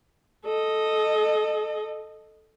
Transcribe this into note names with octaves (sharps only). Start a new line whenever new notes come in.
A4 D#5